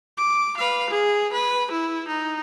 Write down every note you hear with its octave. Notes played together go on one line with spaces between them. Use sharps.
D6
B4 F5
G#4
B4
E4
D#4